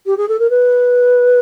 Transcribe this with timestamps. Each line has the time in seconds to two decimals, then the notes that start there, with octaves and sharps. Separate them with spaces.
0.06 G4
0.17 G#4
0.28 A4
0.39 A#4
0.50 B4